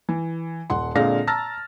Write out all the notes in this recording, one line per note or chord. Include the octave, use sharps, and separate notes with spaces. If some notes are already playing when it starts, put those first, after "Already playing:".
E3
D#1 F#5 C6
A#2 D3 G#3 C4 F5 A#6
A5 A#5 E6 F6 A6 A#6